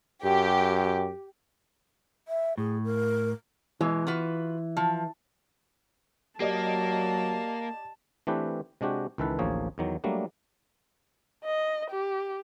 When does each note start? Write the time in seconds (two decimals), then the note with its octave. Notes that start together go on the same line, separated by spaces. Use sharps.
0.24 F#2 G4
2.28 E5
2.58 A2 G#4
2.84 A#4
3.81 B2 E3 G#3
4.07 F4 F#4 B4
4.77 F3
6.40 F#3 A#3 G4 D5 D#5 A5
8.27 E3 A3 C4 D4 G4 B4
8.81 C3 G#3 D4 F#4 G4
9.18 C#2 D#3 E3 A4 B4
9.39 A1 D2 F3 A#3 G#4 C#5
9.78 E2 D#3 F#3
10.04 F#3 G3 A3 A#3 D4
11.44 D#5
11.91 G4